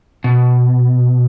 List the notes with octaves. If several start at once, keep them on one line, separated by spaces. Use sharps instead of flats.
B2